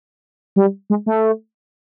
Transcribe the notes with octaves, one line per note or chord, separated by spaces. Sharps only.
G3
G#3
A3